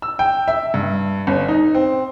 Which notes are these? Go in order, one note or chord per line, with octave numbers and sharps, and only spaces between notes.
E6
G5
E5
G2
G1
D#4
C4